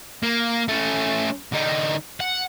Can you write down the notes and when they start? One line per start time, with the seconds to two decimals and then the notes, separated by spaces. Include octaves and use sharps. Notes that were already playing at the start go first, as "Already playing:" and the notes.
0.23 A#3
0.68 A3 C#4
1.53 D3 D#4
2.20 F#5